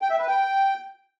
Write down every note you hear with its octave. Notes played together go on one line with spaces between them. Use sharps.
G5
E5
B4
G5